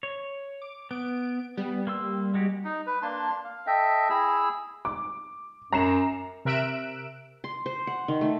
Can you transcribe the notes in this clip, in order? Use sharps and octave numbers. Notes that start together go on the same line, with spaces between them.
C#5
D6
B3 D7
G3 B3
A#3 C6 E6
G#3 F#4 G4
D#4
B4
A#3 D4 A5 C6
F5
A4 D#5 E5 G5
E4 G#4 E6
D6
F#2 A#5 C7 E7
C3 A#4 E5 F#6 D7 E7
C6
C5
F#5
D#3
A3